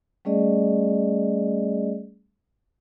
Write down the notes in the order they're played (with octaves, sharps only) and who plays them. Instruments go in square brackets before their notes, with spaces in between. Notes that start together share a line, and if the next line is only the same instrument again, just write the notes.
[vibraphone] G3 A3 C#4 G#4 D5 D#5